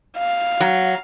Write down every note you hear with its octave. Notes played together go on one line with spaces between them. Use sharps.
F5
F#3